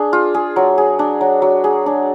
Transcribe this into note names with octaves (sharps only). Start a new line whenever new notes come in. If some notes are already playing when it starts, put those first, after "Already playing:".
Already playing: D4 G#4
F4
G#4
F#3
G#4
D4
F#3
F#3
G#4
D4